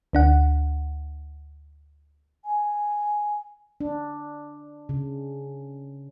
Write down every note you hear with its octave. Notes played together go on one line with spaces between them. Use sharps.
D2 D4 F#5
G#5
D4
C#3